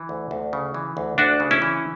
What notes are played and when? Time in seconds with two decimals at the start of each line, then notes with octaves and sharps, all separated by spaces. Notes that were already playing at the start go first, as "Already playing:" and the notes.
Already playing: E3
0.09 D2
0.31 D2
0.53 C#3
0.74 E3
0.97 D2
1.18 D2 D4 F#4
1.40 C#3
1.51 C#4 E4
1.62 E3